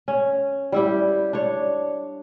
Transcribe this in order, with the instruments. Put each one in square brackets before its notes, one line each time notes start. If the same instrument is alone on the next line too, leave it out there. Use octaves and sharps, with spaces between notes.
[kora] C#4
G3 E4 G4
D4 C#5